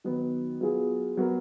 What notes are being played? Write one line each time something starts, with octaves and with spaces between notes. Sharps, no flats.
D#3 F#3 B3 D#4
F#3 B3 F4 G#4
F#3 B3 F#4 A#4